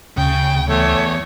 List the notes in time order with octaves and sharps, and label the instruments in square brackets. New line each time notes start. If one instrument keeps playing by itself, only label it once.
[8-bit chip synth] D2 [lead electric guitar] C#3 [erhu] G5
[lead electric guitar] E2 [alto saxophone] A3 [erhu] C#5